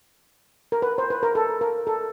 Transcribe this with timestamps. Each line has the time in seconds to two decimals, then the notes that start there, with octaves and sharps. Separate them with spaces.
0.72 A#4
0.82 B4
0.98 C5
1.10 B4
1.23 A#4
1.35 A4
1.61 A#4
1.87 A4